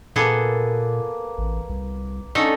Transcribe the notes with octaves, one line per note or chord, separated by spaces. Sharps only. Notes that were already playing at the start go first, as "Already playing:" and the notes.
A#2 A#3 B3 G#4 A4 B4
A1
C2
D3 A3 C#4 D#4 A4